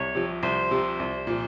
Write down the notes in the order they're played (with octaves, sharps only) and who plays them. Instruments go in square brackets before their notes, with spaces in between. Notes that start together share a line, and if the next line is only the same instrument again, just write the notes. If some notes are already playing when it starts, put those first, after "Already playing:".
Already playing: [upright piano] C2 [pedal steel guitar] C#5
[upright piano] C3 F3
[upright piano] C2 [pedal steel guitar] C5
[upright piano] C3 F3
C2
A#2 F3